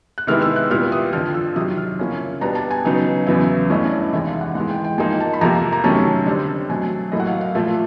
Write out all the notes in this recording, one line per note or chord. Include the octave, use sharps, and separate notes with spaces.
F#6
C3 D#3 G#3 B3 E4 F6
E6
F#6
A#2 G3 B3 E4 F6
D#6
F2 D3 F3 F6
E6
C3 D#3 F#3 D#6
F6
C#3 F3 A#3 C#4 E4
B2 G3 B3 D4 A#5
A5
G#5
C#3 F#3 B3 D#4
E2 C#3 F#3 B3 E4
G2 E3 A3 C#4 D#5
D#5
D5
E2 C3 D#3 G#3 E5
F5
F#5
G#2 E3 G#3 F#5
G5
G5
G#2 F3 A#3 D#4 G#5
A5
B5
F2 C3 F3 A#3 A#5
A#5
C3 D#3 F#3 A3 C#4 A5
D3 G3 C4 A5
B2 F#3 A3 G#5
A2 F#3 A#3 D#5
F#5
F5
F5
A#2 F3 A3 E5